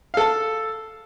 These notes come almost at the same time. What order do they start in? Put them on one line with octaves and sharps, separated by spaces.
F5 A4 A5